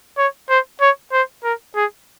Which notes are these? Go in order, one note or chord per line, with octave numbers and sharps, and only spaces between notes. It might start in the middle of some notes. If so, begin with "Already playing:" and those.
C#5
C5
C#5
C5
A#4
G#4